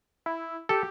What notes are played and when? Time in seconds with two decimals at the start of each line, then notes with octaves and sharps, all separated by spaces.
0.26 E4
0.69 G4 A4